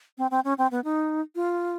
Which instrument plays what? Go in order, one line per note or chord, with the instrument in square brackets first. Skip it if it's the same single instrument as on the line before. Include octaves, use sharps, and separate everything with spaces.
[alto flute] C4
C4
C#4
C4
B3
D#4
F4